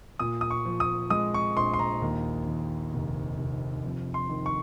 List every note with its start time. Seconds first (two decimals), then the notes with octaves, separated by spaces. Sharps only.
0.19 A#2 D#6
0.41 D#6
0.50 C#6
0.65 F3
0.80 D#6
1.10 G#3 D#6
1.34 C#6
1.57 A#1 C6
1.74 C6
1.79 A#5
2.02 D#2
2.47 D#3
2.93 F1
3.38 F1
3.84 F2
4.14 C6
4.29 D#3
4.46 C#6